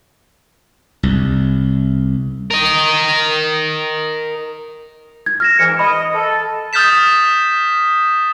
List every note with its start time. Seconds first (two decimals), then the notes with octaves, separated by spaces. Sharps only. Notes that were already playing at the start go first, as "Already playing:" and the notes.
1.03 C2
2.51 A#4 D#5
5.26 G#6
5.40 F6 A#6 E7
5.59 G#2 E3 A#4 C#7
5.79 D#5 B5
6.14 A4
6.73 D#6 F6 G6 A6 B6 E7